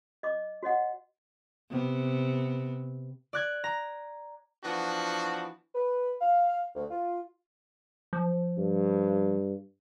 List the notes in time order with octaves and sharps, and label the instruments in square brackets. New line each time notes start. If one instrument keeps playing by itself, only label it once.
[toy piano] D#5 D6
F#4 C#5 D#5 F#5
[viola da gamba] C3 B3
[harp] D5 F#6 G#6
A#5
[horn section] E3 F3 B3 D4 F#4
[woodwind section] B4
F5
D2
F4
[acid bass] F3
[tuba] G2